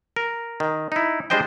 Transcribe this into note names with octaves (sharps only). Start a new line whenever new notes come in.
A#4
D#3
D#4 E4
G3 G#3 D4 C5 D#5 G5